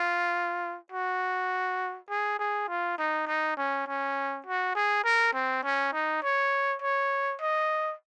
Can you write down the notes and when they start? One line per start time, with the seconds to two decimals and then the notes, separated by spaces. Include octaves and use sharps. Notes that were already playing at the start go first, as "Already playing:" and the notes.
Already playing: F4
0.92 F#4
2.10 G#4
2.39 G#4
2.69 F4
2.98 D#4
3.27 D#4
3.57 C#4
3.87 C#4
4.46 F#4
4.75 G#4
5.04 A#4
5.34 C4
5.64 C#4
5.93 D#4
6.23 C#5
6.82 C#5
7.41 D#5